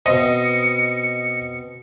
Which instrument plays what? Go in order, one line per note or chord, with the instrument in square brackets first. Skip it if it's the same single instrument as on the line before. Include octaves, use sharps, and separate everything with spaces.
[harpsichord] B2 C4 [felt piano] D#5 [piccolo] C#7